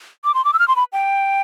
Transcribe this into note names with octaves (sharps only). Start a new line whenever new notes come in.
D6
C6
D6
E6
F6
C6
B5
G5